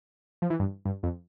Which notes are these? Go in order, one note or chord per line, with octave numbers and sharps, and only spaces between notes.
F3
E3
G2
G2
F2